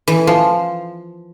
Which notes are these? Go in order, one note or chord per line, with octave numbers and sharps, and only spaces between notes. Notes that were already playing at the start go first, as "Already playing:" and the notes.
E3
F3